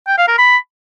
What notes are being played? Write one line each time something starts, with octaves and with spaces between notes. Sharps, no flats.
G5
F5
A#4
B5